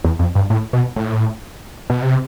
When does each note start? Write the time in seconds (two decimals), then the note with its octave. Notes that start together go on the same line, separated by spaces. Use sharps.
0.04 E2
0.19 F2
0.35 G2
0.50 A2
0.73 B2
0.96 A2
1.90 B2
2.03 C3